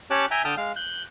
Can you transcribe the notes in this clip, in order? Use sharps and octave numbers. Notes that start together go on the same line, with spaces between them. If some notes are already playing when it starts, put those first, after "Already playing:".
C#4 G4 C#5 A5 D6 F#6
E5 G5 G#5 A#5
D3 G5 A5 D#6 F6
G#3 F5
F#6 G6